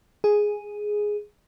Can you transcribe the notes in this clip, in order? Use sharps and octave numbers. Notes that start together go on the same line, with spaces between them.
G#4